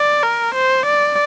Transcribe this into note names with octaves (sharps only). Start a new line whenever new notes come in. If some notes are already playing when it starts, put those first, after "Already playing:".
Already playing: D5
A#4
C5
D5